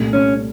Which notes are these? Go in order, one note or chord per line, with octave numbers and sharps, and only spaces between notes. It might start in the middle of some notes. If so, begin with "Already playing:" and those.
Already playing: C2 A#2 A3
C#4